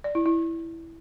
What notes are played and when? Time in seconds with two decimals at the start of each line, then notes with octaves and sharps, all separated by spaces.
0.04 D5
0.15 E4
0.26 E4